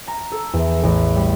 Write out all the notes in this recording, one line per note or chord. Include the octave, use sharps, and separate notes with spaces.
A#5
A4
E2
A1
G3